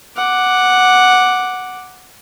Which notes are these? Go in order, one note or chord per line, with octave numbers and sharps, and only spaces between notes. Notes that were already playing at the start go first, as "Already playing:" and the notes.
F#5 D6